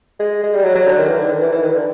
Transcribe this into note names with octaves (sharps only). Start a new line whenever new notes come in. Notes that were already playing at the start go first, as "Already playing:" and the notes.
G#3
G#3
G3
F#3
F#3
D3
D#3
E3
D3
D#3
E3
E3
D#3
D3